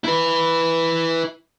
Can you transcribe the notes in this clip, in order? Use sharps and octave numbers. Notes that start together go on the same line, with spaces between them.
E4 B4